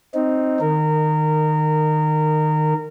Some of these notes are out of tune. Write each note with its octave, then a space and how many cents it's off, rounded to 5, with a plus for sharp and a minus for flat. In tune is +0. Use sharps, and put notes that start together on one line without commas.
C4 +0 D#4 +0
D#3 -15 A#4 -20